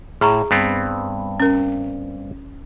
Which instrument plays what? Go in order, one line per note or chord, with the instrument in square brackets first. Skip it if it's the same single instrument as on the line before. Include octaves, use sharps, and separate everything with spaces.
[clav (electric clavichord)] A2 [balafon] G#4 A#5 C#6
[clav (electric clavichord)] G2 B3 C4
[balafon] C#4 A#4